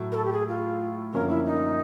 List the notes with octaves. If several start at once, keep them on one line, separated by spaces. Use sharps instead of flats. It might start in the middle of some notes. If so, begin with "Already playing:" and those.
Already playing: A2 F#3 A3
A#4
A4
G4
G#4
F4
F#2 D3 F3 A#3 C#4 A#4
E4
D#4